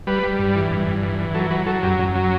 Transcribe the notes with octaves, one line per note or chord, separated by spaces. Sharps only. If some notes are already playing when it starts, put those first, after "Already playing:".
G3 B4
G3
G2
E3
G2
G2
E3
E3
F#3 A4
F#3 B4
F#3 A4
F#2 G4
F#2
F#3